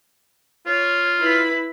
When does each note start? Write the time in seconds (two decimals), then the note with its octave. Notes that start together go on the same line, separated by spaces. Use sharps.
0.66 F4 C#5
1.18 E4 B4 B5